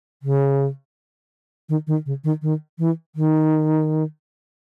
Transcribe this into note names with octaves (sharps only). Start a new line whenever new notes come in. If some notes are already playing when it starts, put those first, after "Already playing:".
C#3
D#3
D#3
C#3
D#3
D#3
E3
D#3